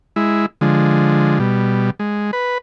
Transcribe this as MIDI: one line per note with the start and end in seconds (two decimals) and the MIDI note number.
0.16 0.46 56
0.16 0.46 64
0.61 1.39 50
0.61 1.39 53
0.61 1.39 56
1.40 1.90 47
1.40 1.90 55
1.99 2.31 56
2.33 2.58 71